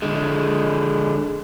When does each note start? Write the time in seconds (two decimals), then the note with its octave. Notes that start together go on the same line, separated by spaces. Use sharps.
0.02 D3 G#3